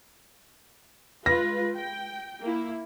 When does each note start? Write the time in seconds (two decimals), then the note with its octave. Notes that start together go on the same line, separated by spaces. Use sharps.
1.26 G#3 F4 B4 A#6
1.76 G5
2.41 A#3 E4